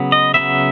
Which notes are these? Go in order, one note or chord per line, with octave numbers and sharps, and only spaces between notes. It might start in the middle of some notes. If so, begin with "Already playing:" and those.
Already playing: C#3 F#3 B3
D#5
C#3 F#3 B3 E5